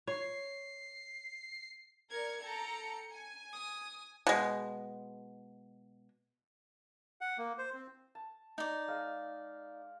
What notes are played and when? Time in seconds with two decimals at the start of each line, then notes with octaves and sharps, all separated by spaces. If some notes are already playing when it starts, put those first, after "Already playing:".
0.07 C#5 C7
2.10 A#4 D5 G#6 C#7
2.42 A4 G5 A#5 C#7
3.13 G#5
3.53 D#6
4.27 B2 G#3
7.21 F#5
7.38 A#3
7.58 C5
7.73 C4
8.15 A5
8.58 D#4 D5
8.88 G#3 F5